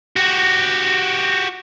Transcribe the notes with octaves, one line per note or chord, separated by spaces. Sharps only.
F#4 G4